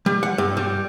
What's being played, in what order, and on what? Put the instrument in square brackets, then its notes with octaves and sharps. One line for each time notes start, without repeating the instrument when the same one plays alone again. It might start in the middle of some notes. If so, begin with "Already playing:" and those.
[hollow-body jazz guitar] G3
F#5
G2
G3